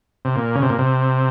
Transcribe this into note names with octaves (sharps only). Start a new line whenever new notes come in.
C3
A#2
C#3
C3
A#2
C3